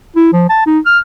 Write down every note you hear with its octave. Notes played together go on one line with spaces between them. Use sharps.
E4
F3
A5
D#4
F6